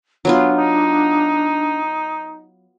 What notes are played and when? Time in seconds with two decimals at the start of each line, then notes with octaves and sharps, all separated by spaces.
0.25 F#3 B3 D4 F4
0.57 D#4